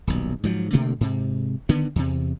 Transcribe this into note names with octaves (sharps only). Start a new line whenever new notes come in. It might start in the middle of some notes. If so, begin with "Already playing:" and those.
D#1 B1
G#2 F3 F#3
B2 D3 A3 A#3
G#2 C3
D3 D#3 B3
E2 C3